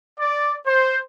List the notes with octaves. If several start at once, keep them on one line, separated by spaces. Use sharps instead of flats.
D5
C5